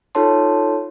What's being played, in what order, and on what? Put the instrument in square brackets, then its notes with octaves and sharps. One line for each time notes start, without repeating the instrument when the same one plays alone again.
[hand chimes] D#4 F4 A4 C#5 A5 C6